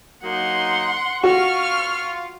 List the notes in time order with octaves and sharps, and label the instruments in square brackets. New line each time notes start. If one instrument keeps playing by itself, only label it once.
[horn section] F#3 A#3 D#4 [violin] F#5 C6
[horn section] F4 [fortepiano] F#4 [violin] C#6 F6